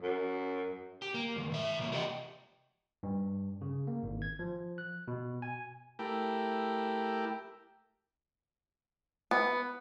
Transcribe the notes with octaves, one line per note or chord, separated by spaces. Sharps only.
F#2
G4
A#3
F2 D#3
G#2 E5
C3 E3 A#3
F4 G4 D5 D#5 F#5 G5
G2
C#3
A#3
G#1
G#6
F3
F#6
B2
G#5
A3 E4 G4 A#4 G5
B3